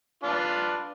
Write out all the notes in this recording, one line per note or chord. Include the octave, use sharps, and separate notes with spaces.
D4 F4 B4